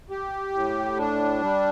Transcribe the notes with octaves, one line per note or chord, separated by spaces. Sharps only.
G4
A2
D4
G3